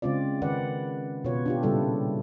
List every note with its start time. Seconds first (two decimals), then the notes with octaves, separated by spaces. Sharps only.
0.02 C#3 G#3 C4 F4 D5
0.42 D#3 B4 D5 F#5
1.24 B2 F4 B4 C#5
1.46 D4 F4 G4
1.63 A#2 C#3 G3 E4 G4 A4